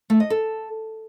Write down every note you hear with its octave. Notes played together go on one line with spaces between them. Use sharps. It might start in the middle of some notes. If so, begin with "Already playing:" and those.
A3
D#5
A4